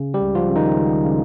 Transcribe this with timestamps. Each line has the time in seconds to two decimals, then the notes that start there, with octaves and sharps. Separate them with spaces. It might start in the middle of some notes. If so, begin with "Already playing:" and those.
Already playing: C#3
0.14 G3 G4
0.21 C#2
0.35 F3 F4
0.50 C#3
0.56 D#3 D#4
0.77 C#2
1.05 C#3